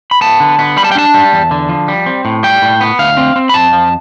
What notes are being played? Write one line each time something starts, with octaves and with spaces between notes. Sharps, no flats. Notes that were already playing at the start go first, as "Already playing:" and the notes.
B5
B3 A5
D3
B3
G3 B5
A5
G5
D4 A5
G3
E2
D3
F3
G3
C4
A2
G3 G5
A2
B3
D2 F5
C4
C4
B5
F2 A5
F3